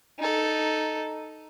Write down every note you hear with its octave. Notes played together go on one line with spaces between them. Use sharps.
D#4 A4